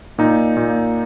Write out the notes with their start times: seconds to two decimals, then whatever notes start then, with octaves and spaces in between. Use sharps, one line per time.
0.18 A#2 D#4
0.57 A#2